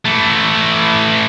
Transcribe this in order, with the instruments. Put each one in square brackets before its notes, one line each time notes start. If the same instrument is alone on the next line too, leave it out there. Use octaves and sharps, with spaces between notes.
[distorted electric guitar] E3 A3